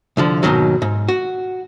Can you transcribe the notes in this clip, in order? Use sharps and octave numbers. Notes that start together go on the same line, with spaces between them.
C2 D3 F3
D#2 G#2 B2 D#3 F#3
G#2
F#4